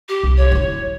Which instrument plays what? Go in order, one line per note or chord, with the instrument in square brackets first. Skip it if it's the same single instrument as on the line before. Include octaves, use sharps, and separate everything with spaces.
[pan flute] G4
[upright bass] C2
[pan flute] C#5
[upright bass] F#3 E4